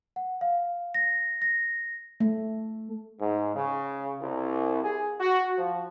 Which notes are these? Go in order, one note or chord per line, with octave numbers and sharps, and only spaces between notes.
F#5
F5
A#6
A#6
A3
G#2
C#3
C2
G#4
F#4
F3